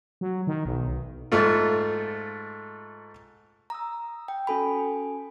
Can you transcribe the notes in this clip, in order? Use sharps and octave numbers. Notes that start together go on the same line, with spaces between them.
F#3
D#3
B1
G#2 A3 F4
A#5 D#6 E6
G5
C#4 F#4 A4 G#5 B5